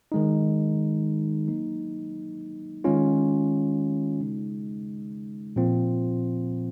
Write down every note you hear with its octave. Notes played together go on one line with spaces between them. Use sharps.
D#3 G#3 D#4
F#3 A#3 D#4
D#3 G#3 C#4 F4
C#3 G#3 D#4
A#2 F3 C4 F4